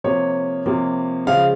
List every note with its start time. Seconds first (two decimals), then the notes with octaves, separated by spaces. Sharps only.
0.04 C3 F3 A#3 C#5
0.66 C3 F3 A#3
1.27 C#3 F3 G#3 F5